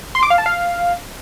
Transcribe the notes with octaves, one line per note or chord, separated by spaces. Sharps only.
C6
D6
F5
A5
F5